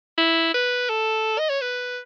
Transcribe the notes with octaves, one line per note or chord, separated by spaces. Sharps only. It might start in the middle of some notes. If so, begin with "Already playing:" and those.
E4
B4
A4
D#5
C#5
B4